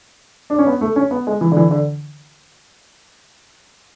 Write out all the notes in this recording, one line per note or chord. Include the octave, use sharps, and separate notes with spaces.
D4
C#4
B3
A3
C#4
B3
G#3
E3
D3
E3
D3